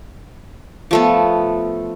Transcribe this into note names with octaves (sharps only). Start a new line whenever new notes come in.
F3 A3 B3